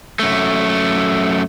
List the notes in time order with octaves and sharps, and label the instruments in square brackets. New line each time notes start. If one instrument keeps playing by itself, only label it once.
[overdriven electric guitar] F#2 A3